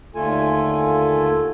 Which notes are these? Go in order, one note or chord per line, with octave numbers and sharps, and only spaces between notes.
D#2 D3 A3 F4 A4 G#5